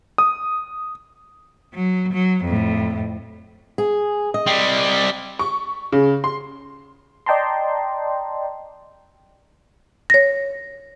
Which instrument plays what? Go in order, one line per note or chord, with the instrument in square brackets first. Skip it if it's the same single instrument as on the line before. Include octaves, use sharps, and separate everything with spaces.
[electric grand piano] D#6
[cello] F#3
F#3
F2 A2
[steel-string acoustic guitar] G#4
D#5
[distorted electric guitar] G3 C4
[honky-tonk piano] C#6
C#3
C6
[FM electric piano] D5 D#5 G5 A5 A#5 C6
[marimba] C#5 A#6